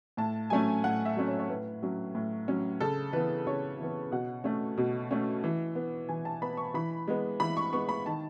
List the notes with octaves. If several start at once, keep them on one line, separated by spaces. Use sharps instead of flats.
A2 A5
F#3 A3 C#4 G#5
A2 F#5
E5
F#3 A3 C#4
C#5
C#5
A2 B4
F#3 C#4
A2
F#3 C#4
C#3 A4
E3 B3 B4
C#3 C#5
E3 B3
B2 F#5
A3 C#4
B2
A3 C#4
E3
B3
E3 G#5
A5
B3 B5
C#6
E3 B5
G#3 B3
E3 B5
C#6
G#3 B3 C#6
B5
D#3 A5